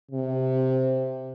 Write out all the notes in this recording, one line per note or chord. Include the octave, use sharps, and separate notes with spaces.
C3